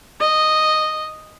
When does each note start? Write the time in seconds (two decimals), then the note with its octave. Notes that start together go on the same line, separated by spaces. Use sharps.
0.20 D#5